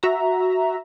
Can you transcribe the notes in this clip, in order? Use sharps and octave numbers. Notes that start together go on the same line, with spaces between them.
F#4 E5 A#5